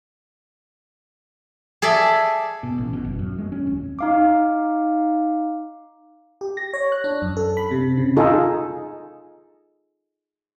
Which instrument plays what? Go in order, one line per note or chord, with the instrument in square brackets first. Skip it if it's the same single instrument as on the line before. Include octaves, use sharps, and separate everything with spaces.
[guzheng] G#4 A4 D5 E5
[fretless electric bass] B2
A1
B2
F#1
F#2
G#3
C#4
D1
[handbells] D#4 F5 D6
[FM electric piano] G4
A#6
C#5
F#6
D4
F#2
A4
B5
C3
C#3
[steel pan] D#4 F4 G#4 A4